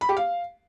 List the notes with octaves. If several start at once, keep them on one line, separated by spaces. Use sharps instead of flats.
B5
G4
F5